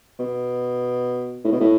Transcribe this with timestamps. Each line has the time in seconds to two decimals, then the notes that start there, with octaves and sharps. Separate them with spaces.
0.19 B2
1.45 A2
1.52 B2
1.61 A2